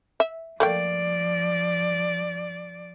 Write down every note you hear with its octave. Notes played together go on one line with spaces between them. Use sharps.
E5
F3 A3 A#3 D5 G5